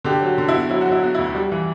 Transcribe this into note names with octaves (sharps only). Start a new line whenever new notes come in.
D3 G4
F#3
F#4
D3
E4
B3 F#4
F#3 E4
F#3 F#4
E4
B3 F#4
D2 E4
G3
E3